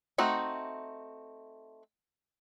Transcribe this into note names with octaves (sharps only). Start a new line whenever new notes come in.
A3 C4 D#4 F#4